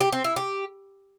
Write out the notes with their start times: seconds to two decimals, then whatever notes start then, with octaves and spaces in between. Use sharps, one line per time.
0.01 G4
0.12 C4
0.24 E4
0.36 G4